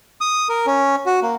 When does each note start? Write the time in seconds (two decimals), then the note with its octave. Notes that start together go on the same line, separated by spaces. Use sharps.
0.21 D#6
0.49 A#4
0.66 C#4
1.06 F#4
1.22 A#3